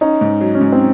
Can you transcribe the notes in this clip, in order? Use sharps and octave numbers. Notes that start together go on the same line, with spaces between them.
C#4 D#4
G#2
F#3
C#4
G#2
C4